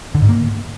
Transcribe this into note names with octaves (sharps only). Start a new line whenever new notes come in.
D3
G#2
A#3